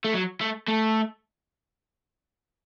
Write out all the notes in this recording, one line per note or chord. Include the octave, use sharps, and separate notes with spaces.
A3
F#3
A3
A3